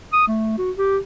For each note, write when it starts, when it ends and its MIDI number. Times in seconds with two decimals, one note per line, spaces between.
0.13 0.27 87
0.28 0.54 57
0.58 0.71 66
0.77 0.98 67